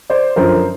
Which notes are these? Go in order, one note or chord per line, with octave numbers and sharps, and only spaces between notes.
C5 D5
F#2 D3 F3 A#4 C5